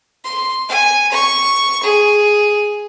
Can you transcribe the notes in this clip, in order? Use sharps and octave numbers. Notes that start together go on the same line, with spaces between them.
C6
G#5
C#6
G#4